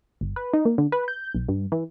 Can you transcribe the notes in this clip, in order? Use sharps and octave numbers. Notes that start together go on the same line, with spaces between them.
G1
B4
D#4
A#3
D3
B4
G6
B1
G2
E3